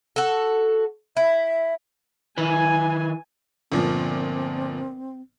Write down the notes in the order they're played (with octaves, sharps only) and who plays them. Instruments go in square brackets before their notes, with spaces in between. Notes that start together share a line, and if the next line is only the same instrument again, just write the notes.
[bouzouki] F#4 A4
[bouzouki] E4 [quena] E5
[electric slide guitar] D#3 E4 B4 [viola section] G#5
[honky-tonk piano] G1 A#2 F3 [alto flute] C4